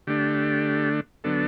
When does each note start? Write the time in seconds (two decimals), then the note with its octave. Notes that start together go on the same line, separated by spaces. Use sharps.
0.07 D3 A3 D4 G4
1.24 D3 F#3 B3 D4 A4